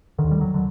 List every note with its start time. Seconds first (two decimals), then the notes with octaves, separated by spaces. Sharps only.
0.19 D3 D#3
0.24 D#2
0.31 G3
0.41 F#3
0.54 D3